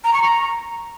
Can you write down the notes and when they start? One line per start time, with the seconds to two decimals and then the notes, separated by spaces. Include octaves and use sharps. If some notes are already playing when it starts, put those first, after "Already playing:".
0.04 A#5
0.14 C#6
0.23 A#5